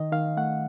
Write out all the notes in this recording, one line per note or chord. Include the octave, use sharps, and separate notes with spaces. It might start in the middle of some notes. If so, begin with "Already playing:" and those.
Already playing: D#3 D#5
D#3 F5
A3 F#5